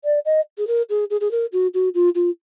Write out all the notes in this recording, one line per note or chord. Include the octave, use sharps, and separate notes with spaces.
D5
D#5
G#4
A#4
G#4
G#4
G#4
A#4
F#4
F#4
F4
F4